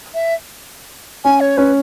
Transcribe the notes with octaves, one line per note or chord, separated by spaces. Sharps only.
E5
C#4 G#5
C#5
C#4 B4